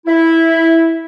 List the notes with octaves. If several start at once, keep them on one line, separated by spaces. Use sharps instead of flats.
E4